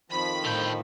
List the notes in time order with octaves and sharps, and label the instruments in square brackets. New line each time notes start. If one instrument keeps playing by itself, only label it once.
[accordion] F2 D#3 F3 [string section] B5
[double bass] A2 [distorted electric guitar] D3 G5